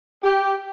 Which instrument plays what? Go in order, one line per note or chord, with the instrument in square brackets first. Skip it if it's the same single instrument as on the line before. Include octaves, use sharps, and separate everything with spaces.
[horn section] G4